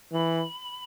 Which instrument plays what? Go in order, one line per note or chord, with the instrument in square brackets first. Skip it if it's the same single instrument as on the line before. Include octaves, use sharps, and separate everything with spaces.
[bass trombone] E3 [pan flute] B5